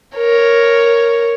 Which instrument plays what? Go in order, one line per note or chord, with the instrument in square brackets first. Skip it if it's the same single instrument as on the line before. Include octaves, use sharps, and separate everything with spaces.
[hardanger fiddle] A#4 C#5